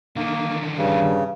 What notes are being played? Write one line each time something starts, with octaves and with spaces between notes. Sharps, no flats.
D3 D#3 A#3
G2 C#3